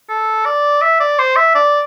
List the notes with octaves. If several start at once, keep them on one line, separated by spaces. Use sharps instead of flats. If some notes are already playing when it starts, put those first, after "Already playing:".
A4
D5
E5
D5
C5
E5
D5